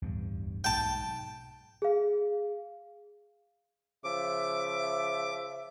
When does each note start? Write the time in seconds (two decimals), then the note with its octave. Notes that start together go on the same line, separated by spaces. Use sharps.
0.02 D1 E2 G2
0.64 B1 G#2 G5 A5
1.82 G#4 F5
4.04 C#3 F3 E5 D6